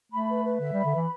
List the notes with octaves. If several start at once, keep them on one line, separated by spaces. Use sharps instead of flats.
A3 B5
B4
B4
D3 E5
G3 B5
D3
E3 B4